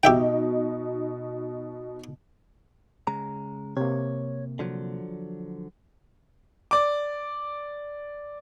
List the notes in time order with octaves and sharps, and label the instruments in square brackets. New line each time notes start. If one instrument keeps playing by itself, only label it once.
[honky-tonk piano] B2 D#4 [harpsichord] G4 E5 G5
[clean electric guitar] C#3 G#3 A#5
[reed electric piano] C3 A#3 [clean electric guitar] C#5
[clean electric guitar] D3 F3 F#3
[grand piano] D5 D6